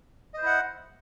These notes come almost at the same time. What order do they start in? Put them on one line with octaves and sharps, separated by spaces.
D#5 C5 E4 F#5